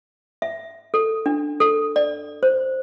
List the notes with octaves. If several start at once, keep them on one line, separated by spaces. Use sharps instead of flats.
E5
A4
D4
A4
D5
C5